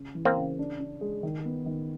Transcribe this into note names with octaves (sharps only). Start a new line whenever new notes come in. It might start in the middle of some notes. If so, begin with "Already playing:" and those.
Already playing: C#3
E3
A#3 C4
C#3
D4
D4
G#3
D#3
B3
D#3